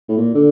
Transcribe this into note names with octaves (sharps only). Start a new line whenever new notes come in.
A2
A#2
D3